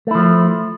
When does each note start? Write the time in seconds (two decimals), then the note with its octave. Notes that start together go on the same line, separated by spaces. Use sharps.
0.07 A3
0.11 E4
0.15 F3